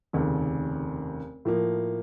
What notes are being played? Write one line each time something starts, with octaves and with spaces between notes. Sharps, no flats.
F1 D#2 C#3
A2 F3 A#3